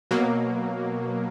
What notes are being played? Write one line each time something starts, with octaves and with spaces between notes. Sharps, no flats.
B2 F#3 A#3